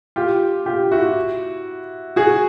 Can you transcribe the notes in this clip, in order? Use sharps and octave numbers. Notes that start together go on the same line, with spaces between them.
F4 G4
F4 G4
E4 F#4
F#4 G#4